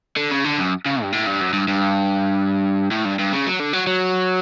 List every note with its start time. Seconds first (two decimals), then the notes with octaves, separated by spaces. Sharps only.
0.16 D3
0.31 C#3
0.44 D3
0.58 F#2
0.86 C#3
1.02 G2
1.12 A2
1.27 G2
1.41 F#2
1.53 G2
1.68 G2
2.91 A2
3.05 G2
3.19 G2
3.33 C#3
3.46 F#3
3.59 D3
3.73 F#3
3.87 F#3